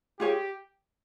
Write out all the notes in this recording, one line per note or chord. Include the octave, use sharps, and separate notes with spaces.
F4 G4 G#4 C#5 G#5